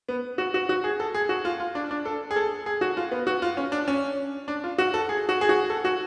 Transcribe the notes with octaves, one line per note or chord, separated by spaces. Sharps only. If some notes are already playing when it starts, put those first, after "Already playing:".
B3
F#4
F#4
F#4
G#4
A4
G#4
F#4
F4
F4
D4
D4
A4
G#4
A4
G#4
F#4
F4
B3
F#4
F4
C#4
D4
C#4
D4
F4
F#4
A4
G#4
F#4
G#4
F#4
A4
F#4